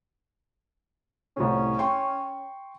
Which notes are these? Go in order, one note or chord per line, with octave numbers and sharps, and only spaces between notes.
C2 A2 C#4
G5 C6 C#6